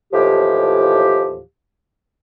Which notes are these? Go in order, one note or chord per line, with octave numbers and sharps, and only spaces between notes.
D#2 A2 E3 F3 G4